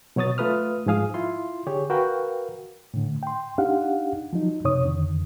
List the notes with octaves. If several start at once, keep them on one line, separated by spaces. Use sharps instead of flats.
B2 F#3 C#5 D#6 A6
A3 F4 A4 B4 D#6 F6
G#2 F3 G#4 F5 D#6
E4 F4 C6
D3 G4 G#4 C#5
F#4 A#4 B4 F5 G5
A2 D3
G5 C6
D4 D#4 G4 F5 F#5
F3 F#3 D#4
F#2 C3 C#5 D#6
F2 D3 D#3